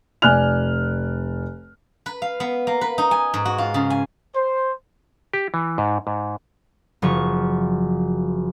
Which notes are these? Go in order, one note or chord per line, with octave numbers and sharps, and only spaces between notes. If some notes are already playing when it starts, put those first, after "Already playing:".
F1 D5 G#5 F6 F#6 F7
B4
F5
B3
A#3
B4
D#4
G#5
G#2
F#4
F4
C#3
G#5
C5
G4
E3
G#2
G#2
F#1 F3 C#6